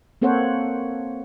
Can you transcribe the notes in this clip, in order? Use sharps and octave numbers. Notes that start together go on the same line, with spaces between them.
A#3 C4 A4 C5 C#5 F#5